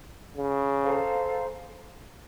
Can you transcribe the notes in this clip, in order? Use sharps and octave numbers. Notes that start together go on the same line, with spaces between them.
C#3
A4 C5 F5 A#5